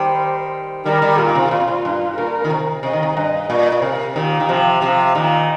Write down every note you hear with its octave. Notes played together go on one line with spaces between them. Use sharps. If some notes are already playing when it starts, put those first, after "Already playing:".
Already playing: D#3 G3 C5
D#3 G3 A#4
D#3 G3
A#2 F4
D#3
C3
A#2
C3
A#2
G2
A#2 A#4
D#3
C3
C3 D#5
D#3
C3
G2 D#5
A#2 D#5
A#2
C3 A#4
A#2 D#3 G4
D#3
C3 F3
C3 F3 C5
A#2 D#3 D#5